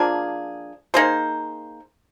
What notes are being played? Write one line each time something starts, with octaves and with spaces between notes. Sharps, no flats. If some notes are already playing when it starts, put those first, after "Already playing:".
Already playing: F3 A#3 D4 G#4
A#3 D#4 G#4 C5